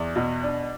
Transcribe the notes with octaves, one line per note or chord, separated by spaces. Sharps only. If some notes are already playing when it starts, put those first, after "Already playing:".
Already playing: E2 D5
B2
D4